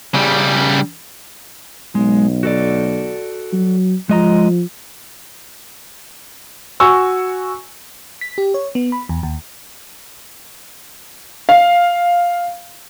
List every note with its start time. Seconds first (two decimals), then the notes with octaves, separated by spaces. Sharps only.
0.14 C#3 G3
1.95 B1 G#3
2.43 F#4 A4 D5
3.53 F#3
4.09 F3 G#3 D#5 A#5
6.80 F#4 G#5 C#6 E6
8.21 B6
8.38 G4
8.54 C#5
8.75 B3
8.92 B5
9.09 E2
9.23 D#2
11.49 F5